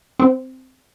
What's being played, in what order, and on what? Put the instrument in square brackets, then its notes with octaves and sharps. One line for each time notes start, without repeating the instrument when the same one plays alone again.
[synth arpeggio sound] C4